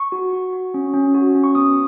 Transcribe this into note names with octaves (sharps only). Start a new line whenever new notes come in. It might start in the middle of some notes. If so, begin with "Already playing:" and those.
Already playing: C#6
F#4
F#4
F#4
C#4
C#4
F#4
C#4
C#6
B3 D#6